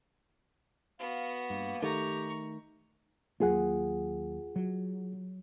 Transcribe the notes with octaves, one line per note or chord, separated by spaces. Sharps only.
B3 F#4 F5
G2 A#3
D#3 A3 G4 A#5 C#6
D#2 F#3 A#3 F4 G#4 F#5
F#3